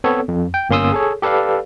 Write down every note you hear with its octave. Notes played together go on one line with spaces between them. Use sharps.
B3 C4 A4 C#5
F2
G5
G1 A#3 C#4 C6 D#6 E6
G#4 A4 C#5
G4 A4 B4 D5 F5